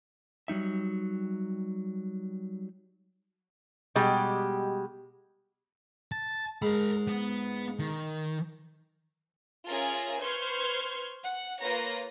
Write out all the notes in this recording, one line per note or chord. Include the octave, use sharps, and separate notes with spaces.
F#3 G3 D#4 E5
B2 G3 G#3 G4
A5
G#2 A#4 B5
B3
D#3
C#4 F4 G#4 A#4 E5
B4 C5 C6 C#6 F6 G#6
F#5
A#3 F4 B4 C#5 A#5 A#6